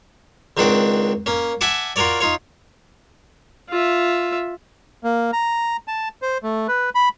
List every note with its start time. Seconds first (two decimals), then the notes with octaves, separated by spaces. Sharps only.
0.57 C#2 D#3 C4 D4 F#4 D6
1.26 A#3 C#4
1.61 E5 F#5 G#5 A5 D6
1.96 F4 F#4 A#4 C#5 D5
2.21 D#4 F4 C#5
3.69 F4 E5
5.04 A#3
5.33 A#5
5.88 A5
6.22 C5
6.43 A3
6.68 B4
6.95 B5